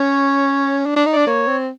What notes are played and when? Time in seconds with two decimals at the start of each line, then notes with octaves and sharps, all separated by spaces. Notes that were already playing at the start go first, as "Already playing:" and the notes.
Already playing: C#4 C#5
0.86 D4
0.96 D4
1.06 D#4
1.13 D4 D5
1.27 A#3 C#5
1.47 C4